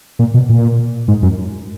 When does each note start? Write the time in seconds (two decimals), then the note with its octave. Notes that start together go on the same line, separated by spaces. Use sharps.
0.19 A#2
0.34 B2
0.50 A#2
1.08 G#2
1.23 F#2